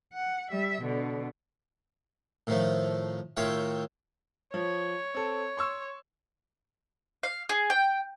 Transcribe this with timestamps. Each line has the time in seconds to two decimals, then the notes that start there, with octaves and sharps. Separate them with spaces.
0.14 F#5
0.51 G3 E5
0.82 B2 D3
2.47 A2 D#3 F3 A3
3.37 A2 D#3 F4 C#5 E5 G5
4.54 F3 C#5
5.14 C4 A4
5.57 C6 C#6 E6
7.23 F5
7.49 G#4
7.70 G5